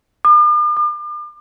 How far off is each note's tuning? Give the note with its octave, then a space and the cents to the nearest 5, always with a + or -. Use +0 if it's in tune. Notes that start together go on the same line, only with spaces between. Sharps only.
D6 +45
D6 +40